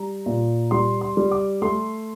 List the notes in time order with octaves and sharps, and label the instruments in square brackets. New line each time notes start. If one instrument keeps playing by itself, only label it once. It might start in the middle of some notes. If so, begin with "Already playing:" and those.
Already playing: [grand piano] G3 A#5
A#2
G3 C6
C6
G3
D6
A3 C6